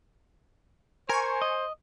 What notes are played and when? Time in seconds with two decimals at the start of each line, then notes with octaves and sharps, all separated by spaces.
1.09 A#4 C5 G#5 C#6
1.42 D#5